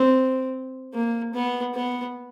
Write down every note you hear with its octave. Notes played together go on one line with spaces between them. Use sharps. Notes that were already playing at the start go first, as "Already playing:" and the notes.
Already playing: C4
A#3
B3
B3